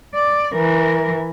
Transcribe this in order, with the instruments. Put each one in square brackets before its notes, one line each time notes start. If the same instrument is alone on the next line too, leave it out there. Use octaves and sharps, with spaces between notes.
[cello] D5
E3 A#4